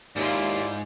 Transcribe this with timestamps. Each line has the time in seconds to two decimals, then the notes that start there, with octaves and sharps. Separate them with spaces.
0.16 D#2 G#2 E4 F4 D5